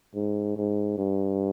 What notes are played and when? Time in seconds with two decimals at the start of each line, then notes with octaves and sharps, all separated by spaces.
0.15 G#2
0.57 G#2
0.98 G2